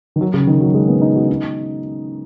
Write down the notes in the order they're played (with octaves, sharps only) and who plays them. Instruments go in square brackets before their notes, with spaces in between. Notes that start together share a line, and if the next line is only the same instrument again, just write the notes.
[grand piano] D#3
F#3
C#3
D#3
F#3
G#3
B3
D#4
F#4
D#4